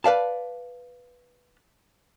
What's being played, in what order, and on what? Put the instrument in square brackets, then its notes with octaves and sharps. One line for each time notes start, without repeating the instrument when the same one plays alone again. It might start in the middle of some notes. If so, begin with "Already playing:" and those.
[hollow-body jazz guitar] B4 D5 F5 A5